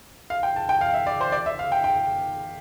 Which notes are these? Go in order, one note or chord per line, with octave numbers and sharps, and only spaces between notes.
F5
G5
A5
G5
F5
E5
D5
C5
D5
E5
F5
G5
G5